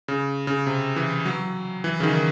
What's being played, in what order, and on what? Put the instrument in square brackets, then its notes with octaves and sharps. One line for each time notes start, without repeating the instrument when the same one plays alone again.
[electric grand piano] C#3
C#3
C3
E3
F#3
E3
C#3
D#3